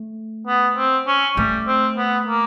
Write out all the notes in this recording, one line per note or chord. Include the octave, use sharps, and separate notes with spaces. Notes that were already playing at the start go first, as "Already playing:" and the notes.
Already playing: A3
B3
C4
C#4
G3 A3
C4
B3
A#3